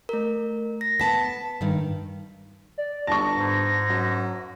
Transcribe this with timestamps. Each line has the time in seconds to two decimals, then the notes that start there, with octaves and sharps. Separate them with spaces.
0.09 A3 A#4
0.81 A#6
1.00 B3 A5 B6
1.61 G2 D#3
2.78 D5
3.07 G1 A5 C#6 A#6
3.35 G#2
3.89 F#2